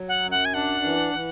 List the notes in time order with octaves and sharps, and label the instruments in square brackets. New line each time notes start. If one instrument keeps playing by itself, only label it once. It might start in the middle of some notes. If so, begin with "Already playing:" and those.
Already playing: [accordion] F#3
[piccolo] F#5
[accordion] F#2
[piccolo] F#5
G#5
[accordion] D4 [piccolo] F#5
[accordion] E3
E3